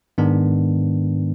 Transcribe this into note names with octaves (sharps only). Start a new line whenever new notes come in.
G#2 D#3 G#3 B3 D4